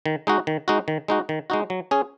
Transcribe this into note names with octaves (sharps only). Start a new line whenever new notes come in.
D#3
G#3 D#4 F#4
D#3
G#3 D#4 F#4
D#3
G#3 D#4 F#4
D#3
G#3 D#4 F#4
F#3
C#4 G#4